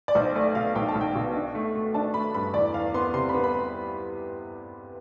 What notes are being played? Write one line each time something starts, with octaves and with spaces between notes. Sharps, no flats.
D5
B1 C5
A3 D5
B2 F5
B1 G5
A5
B1
G5
B2
D4
A3
A3
D4 A5
A3 B5
G2 B5
E2 D5
E2 F5
B3 C6
C3 C6
B5
B3
B5